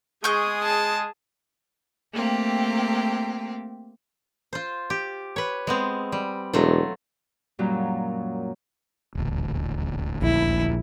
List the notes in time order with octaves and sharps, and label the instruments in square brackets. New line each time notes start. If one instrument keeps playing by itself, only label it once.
[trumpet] G#3 [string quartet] G#4 G#5 D#6 [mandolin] C#6 G6
[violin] A5
[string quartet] A3 A#3 C4 G4
[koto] F4 C5
G4
B4 C#5
G#3 B3 C4
G3
[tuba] E1 [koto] F#3 A3 F4
[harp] F#2 A#2 F#3 G3
[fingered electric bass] D#1 A1 D2
[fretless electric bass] A#1 [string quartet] E4